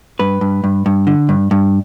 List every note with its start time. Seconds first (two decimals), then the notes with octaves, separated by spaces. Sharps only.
0.19 G2 B4
0.41 G2
0.64 G2
0.86 G2
1.07 D3
1.29 G2
1.51 G2